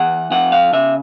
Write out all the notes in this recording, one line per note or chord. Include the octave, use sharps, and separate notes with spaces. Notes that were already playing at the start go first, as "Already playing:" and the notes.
Already playing: E3 F#5
F2 F#5
F5
C#3 E5